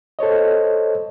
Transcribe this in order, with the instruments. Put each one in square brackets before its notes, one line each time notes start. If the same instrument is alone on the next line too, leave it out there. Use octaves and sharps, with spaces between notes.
[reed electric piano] A4 C5 C#5 D#5